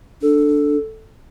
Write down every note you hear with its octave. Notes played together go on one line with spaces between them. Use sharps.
D4 A4